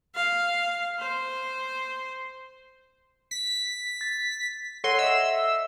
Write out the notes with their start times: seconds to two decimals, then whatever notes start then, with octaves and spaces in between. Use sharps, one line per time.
0.15 F5
0.99 C5
3.31 B6
4.01 A6
4.84 A4 C#5 F#5 C6
4.99 D#5 E5 E6